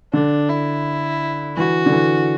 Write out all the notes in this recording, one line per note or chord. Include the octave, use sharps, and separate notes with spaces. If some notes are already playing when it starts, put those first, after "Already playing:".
D3 D4
E4
E3 F#4
D3
E3